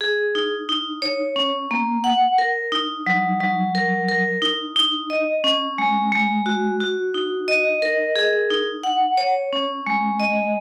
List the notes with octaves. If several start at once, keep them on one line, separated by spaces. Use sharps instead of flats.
G#4
D#4
D#4
C#5
C#4
A#3
F#5
A#4
D#4
F#3
F#3
A#4
A#4
D#4
D#4
D#5
C#4
G#3
G#3
F#4
F#4
D#4
D#5
A#4
G#4
D#4
F#5
C#5
C#4
G#3
D#5